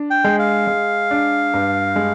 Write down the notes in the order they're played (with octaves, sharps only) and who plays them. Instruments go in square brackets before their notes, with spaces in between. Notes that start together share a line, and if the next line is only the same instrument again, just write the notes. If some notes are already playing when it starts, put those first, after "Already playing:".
Already playing: [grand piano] D4
[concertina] G5
[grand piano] G#3
[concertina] F5
[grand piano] G#3
D4
G2
G#3